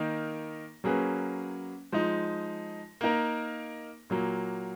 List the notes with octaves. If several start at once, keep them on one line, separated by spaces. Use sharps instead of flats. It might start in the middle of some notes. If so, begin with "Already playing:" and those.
Already playing: D#3 A#3 D#4 A#4
F#3 A#3 C#4 G#4 B4
F3 G#3 D#4
A#3 D#4 A#4
A#2 F#3 A#3